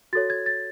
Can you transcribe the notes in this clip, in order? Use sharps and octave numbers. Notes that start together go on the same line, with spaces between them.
F#4 A4 C#5 A6
G#6
A6